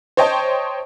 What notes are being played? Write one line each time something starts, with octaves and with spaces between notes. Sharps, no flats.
C5 C#5 D#5 G5 A5